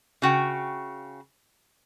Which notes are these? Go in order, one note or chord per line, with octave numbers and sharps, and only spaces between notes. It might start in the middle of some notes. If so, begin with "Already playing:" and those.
C#3 F#4 G5